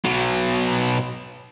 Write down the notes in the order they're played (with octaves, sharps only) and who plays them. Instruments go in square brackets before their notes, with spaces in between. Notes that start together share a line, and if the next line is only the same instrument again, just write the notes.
[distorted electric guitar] B2 F#3